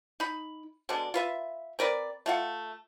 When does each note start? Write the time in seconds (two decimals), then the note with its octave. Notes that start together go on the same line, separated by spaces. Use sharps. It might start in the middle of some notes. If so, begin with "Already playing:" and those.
0.20 D#4 B5
0.89 B2 D3 G#3 D4
1.14 F4 B4 E5
1.79 C4 A#4 B4 D5
2.26 A3 F4 F#5